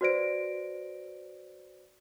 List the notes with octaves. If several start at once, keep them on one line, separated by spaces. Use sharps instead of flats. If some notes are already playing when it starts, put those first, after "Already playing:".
F#4 B4 C5 D5 A#6 D7